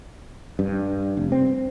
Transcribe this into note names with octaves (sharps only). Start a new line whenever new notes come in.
G2
F1
C4